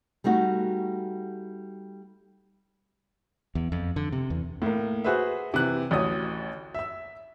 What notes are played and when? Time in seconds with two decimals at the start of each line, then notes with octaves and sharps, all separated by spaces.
0.24 G3 A3 D#4 F#4
3.55 E2
3.72 F2
3.96 D3
4.12 C3
4.30 E2
4.62 A2 A#3
5.04 F#4 G#4 B4 C5 E5
5.54 C3 E3 F#6
5.91 A1 D2 D#6
6.74 E5 E6